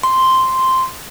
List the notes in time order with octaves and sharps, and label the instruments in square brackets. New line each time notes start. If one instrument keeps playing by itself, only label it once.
[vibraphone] C6